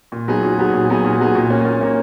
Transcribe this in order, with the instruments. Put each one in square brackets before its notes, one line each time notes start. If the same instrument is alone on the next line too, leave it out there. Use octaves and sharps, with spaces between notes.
[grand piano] A#2
F#3 B3 D#4 G#4
A#2
F#3 B3 D#4 G#4
A#2
F#3 B3 D#4 G#4
A#2
F#3 B3 D#4 G#4
A#2
A#3 C#4
A#2
A#3 C#4